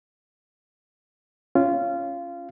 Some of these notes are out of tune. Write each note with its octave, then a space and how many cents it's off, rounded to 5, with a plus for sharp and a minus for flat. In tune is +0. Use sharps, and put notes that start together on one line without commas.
C#4 +0 F4 -20